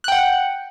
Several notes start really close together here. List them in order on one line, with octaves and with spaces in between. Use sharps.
F#6 G5 F#5